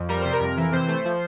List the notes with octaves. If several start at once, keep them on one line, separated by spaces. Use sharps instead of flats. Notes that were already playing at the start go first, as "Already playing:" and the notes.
Already playing: F2
G3 A#4
C3 C5
A#4
F2
E3
C3 C5
A3
F3